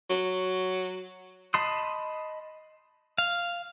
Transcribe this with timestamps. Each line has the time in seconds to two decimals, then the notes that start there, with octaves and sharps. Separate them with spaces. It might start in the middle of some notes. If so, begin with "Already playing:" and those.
0.10 F#3
1.54 D#5 A5 B5 C6 D#6
3.18 F5